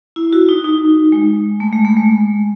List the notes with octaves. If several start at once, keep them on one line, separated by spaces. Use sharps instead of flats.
E4
F#4
D#4
D#4
G#3
A3
G#3
A3
G#3